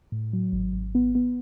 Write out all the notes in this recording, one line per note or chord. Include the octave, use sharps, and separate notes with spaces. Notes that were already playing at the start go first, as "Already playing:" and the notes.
A2
F#3
G#1
G#1
B3
B3